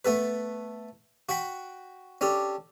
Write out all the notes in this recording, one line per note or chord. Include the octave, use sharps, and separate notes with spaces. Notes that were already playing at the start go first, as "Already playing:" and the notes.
A3 B3 A4 B4
F#4 F#5 G5 B5
C#4 D4 G4 A4